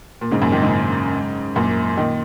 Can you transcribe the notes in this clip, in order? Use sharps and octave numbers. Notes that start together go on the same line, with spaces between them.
A#2
G#2 C#3
F#2 A#2
A#2 D#3
G#2 C#3
F#2 A#2
A#2 D#3